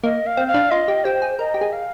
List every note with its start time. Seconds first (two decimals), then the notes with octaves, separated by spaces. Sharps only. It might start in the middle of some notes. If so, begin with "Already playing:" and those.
0.04 A#3 D#5
0.27 F5
0.37 C4
0.48 F5
0.54 D4
0.71 F4 D#5
0.88 G4
1.04 G4 C5
1.22 G#4
1.39 A#4 D#5
1.54 G4
1.61 G#4
1.73 F5